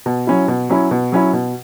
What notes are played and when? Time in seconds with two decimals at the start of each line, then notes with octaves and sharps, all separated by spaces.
0.06 B2
0.27 F#3 C#4 E4
0.48 B2
0.70 F#3 C#4 E4
0.91 B2
1.12 F#3 C#4 E4
1.33 B2